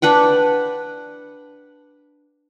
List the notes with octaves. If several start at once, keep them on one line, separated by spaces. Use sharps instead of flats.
D4 B4 F#5 G5